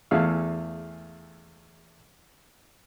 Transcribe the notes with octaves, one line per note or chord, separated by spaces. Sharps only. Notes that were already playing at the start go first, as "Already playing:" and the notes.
E2 A3 G#4 E5 F5 E6